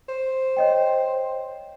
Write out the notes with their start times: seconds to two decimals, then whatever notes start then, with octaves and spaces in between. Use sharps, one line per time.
0.09 C5
0.57 C#5 D#5 G5